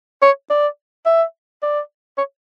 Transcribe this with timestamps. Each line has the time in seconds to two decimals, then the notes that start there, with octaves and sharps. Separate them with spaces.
0.22 C#5
0.50 D5
1.06 E5
1.63 D5
2.18 C#5